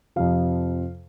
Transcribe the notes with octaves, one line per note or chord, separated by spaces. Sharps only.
F2 C3 F3 F5